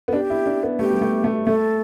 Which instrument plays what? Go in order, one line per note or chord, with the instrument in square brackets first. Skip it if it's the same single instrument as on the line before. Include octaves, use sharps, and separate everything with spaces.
[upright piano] B3
[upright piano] D4 [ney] G4
[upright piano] E4
D4
B3
[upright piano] A3 [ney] G4
[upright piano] G3
A3
A3
[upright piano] A3 [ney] A4